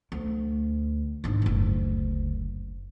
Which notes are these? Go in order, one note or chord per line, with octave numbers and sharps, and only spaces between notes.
D2
G#1 D4
F#1 D2